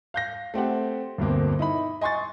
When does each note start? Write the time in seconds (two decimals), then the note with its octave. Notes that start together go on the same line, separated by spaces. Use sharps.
0.14 F5 G6 A#6
0.54 A3 C4 G4 F#5
1.18 D2 G2 B2 A#3 C4
1.59 D#4 E4 B5
2.01 D#5 G#5 C6 C#6 A6